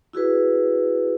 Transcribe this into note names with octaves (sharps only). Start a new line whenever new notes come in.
E4 F#4 G#4 B4